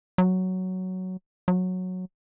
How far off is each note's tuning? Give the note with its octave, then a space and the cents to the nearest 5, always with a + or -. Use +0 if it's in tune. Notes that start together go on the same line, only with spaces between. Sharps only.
F#3 +5
F#3 -10